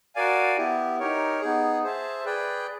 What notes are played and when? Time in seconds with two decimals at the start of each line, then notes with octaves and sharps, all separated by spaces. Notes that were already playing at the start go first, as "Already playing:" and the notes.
0.15 F#4 A#4 D5 F5 G#5
0.57 B3 E4 G4
1.00 D#4 G4 A#4 C#5
1.40 B3 D#4 G#4
1.83 G#4 C5 E5 A5
2.25 G#4 B4 D5 G5